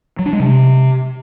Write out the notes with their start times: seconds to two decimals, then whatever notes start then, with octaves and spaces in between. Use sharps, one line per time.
0.19 F#3
0.26 D4
0.33 G#3
0.40 C3